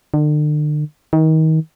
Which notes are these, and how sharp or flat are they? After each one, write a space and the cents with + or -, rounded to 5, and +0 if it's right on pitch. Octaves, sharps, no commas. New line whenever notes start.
D3 +40
D#3 +30